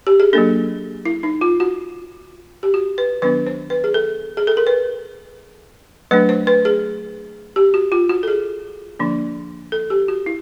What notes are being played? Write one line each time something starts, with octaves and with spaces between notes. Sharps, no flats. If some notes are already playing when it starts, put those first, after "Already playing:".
G4
G#4
F#3 A#3 D4 A4
E4
D#4
F4
F#4
G4
F#4
B4
D#3 F#3 B3 D4 B4
C5
B4
G#4
A4
G#4
A4
A#4
B4
F#3 A3 D4 B4
C5
B4
G#4
G4
F#4
F4
F#4
A4
G#4
D3 F3 A#3 D4
A4
G4
F#4
E4